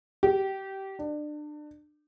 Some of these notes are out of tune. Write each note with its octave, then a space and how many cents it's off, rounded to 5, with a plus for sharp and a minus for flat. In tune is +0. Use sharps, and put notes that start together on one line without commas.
G4 -20
D4 +30